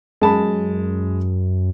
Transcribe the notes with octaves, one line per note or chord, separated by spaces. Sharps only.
F#2 G#3 A5 B5